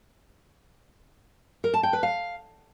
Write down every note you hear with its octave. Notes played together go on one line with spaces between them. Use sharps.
A#4
A5
G5
B4
F5